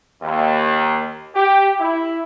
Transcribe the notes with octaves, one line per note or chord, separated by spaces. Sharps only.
D#2
G4
E4